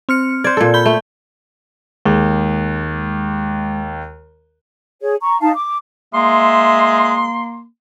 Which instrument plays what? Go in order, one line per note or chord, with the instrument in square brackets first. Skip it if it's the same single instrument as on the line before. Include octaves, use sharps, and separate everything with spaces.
[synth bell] C4 F6 C#7
[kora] C5 D5 [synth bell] G#6
[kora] A#2 A4
[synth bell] B5 G6 G7
[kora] A3
[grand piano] D#2 [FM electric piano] G#3
[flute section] G#4 C#5
A#5 C#6
D#4 F5 A5
D6
[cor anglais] G#3 [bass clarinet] A#3 [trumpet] E5 [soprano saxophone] C6